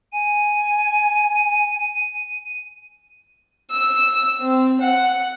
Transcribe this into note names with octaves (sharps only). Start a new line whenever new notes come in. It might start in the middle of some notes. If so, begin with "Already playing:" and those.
G#5 D#7
E6
C4
F#5